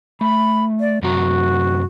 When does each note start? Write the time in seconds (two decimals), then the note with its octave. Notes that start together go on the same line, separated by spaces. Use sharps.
0.21 A3 B5
0.80 D5
1.03 F#2 C3 F#4 A#5